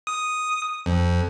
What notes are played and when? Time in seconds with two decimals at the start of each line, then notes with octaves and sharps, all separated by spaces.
0.07 D#6
0.86 F2